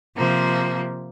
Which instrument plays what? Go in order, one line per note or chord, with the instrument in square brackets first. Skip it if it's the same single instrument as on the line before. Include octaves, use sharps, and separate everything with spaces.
[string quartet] C3 F3 A#3